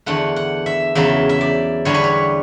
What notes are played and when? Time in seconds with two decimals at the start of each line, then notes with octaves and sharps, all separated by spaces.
0.06 E2 D3 A3 F#5
0.36 F#5
0.66 E5
0.95 E2 C#3 F#3 B3 E5
1.29 E5
1.41 D5
1.85 E2 D3 G3 B3 C#5
1.94 B4
2.04 C#5